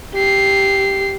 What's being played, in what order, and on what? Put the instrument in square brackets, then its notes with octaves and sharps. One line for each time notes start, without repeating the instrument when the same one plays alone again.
[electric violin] G4 C7